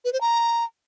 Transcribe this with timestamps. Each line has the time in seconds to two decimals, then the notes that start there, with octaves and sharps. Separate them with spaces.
0.05 B4
0.13 C5
0.21 A#5